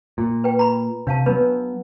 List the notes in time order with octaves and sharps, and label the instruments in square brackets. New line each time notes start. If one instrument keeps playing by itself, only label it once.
[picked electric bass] A#2
[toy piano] B4 G5
A#5 B5
[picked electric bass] C3 [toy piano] D4 F5 A5
[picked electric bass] F#3 B3 [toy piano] D4 B4